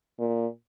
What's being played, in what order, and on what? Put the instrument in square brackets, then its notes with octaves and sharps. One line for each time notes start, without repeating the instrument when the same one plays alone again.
[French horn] A#2